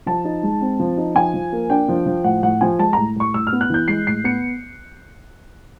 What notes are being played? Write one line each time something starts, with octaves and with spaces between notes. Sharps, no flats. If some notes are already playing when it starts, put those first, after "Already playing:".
F3 A5
D#4
G#3
C4
F3
D#4
F3 G#5
F3
A#3
D4 G5
F3
F3
A2 F#5
A2 F#5
F3 G#5
G#3 A5
A2 A#5
A2 C#6
A2 E6
F6
B3
F#6
E3 G6
G#3 C7
A2 C7
B3 C#7